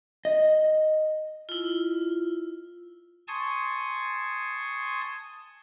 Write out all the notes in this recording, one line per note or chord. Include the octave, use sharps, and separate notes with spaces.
D#5
E4 F4
G#5 A5 C6 C#6 D#6